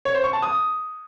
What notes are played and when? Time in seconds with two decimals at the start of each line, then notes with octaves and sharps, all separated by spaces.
0.05 C#5
0.15 C5
0.24 C#6
0.33 A5
0.42 D#6